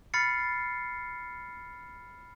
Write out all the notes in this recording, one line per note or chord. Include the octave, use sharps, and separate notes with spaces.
B5 F6 A6 C7 C#7